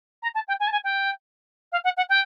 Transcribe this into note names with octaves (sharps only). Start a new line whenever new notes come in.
A#5
A5
G5
G#5
A5
G#5
G5
F5
F#5
F#5
G5